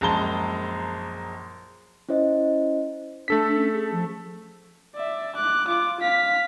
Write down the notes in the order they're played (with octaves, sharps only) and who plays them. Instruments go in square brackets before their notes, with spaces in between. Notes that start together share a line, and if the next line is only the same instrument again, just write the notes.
[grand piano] A#1 F#2 G#3 A5 A#5 G7
[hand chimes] C#4 E4 C5 D#5
[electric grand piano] A3 A4 B6 [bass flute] D4
[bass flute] C#4
G#4
F3
[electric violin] D5 E5
D6 F#6
F4 D6
F5 B6